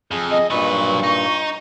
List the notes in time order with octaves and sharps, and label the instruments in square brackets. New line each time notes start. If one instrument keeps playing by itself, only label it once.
[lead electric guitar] F2 [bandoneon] G#4
[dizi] D#5
[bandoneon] G2 A#2 [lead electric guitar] F#3 B4 [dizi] C#6
[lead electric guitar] D#4